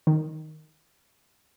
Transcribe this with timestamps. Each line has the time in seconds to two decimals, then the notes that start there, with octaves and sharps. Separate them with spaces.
0.07 D#3